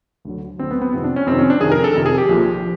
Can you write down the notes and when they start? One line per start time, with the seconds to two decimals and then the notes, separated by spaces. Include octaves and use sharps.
0.25 D2 D3 F#3
0.59 D2 D3 F#3 C4
0.71 B3
0.82 B3
0.93 F2 C3 D#3 C4
1.04 D4
1.16 C#4
1.26 F2 C3 D#3 C4
1.39 C#4
1.50 D4
1.60 F2 C3 D#3 G#4
1.72 A#4
1.84 A4
1.95 F2 C3 D#3
2.06 G#4
2.18 G4
2.29 A#1 A#2 F3